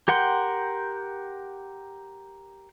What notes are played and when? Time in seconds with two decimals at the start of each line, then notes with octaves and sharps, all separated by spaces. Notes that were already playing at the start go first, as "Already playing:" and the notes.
0.08 G4 A#4 F#5 G5 C6